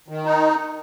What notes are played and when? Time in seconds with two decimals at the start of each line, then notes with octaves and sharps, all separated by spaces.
0.08 D#3
0.25 D#4